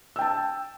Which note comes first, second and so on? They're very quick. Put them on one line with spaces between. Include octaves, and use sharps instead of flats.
E6 G5 A5